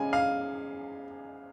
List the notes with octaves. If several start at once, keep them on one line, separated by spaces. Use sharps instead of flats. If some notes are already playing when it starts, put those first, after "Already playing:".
Already playing: C#3 G#3 G#5
F5